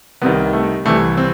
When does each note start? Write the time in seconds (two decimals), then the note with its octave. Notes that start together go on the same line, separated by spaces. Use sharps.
0.22 C2 C3 D#3 B3
0.53 A3
0.85 C2 C3 E3 A3
1.17 C4